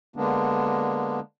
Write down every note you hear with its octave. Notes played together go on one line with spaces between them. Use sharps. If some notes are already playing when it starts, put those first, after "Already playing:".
D3 G#3 A#3 B3 D4